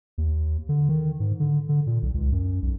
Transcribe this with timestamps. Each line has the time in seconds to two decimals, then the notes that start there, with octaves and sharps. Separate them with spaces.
0.18 D#2
0.69 D3
0.89 D#3
1.20 G#2
1.40 D3
1.69 D3
1.87 A#2
2.02 B1
2.14 C#2
2.32 F#2
2.62 B1